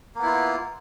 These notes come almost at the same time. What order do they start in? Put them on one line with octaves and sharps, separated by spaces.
A#3 B3 E4 F4